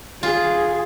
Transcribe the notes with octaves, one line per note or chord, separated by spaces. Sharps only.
F4 G#4